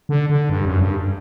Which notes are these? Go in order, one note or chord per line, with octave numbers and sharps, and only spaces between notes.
D3
D3
G2
F#2
G2